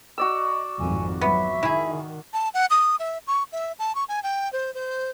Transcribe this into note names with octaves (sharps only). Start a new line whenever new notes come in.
F#4 D5 D#5 E6
G#1 F2 G#2 G#5
F#3 B3 E5
D#3 E4 G#4
A5
F#5
D#6
E5
C#6
E5
A5
C#6
G#5
G5
C5
C5